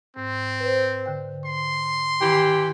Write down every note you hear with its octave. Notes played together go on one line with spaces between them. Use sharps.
G#2 C4
B4 C5
D3 G5
C6
D#3 E3 G4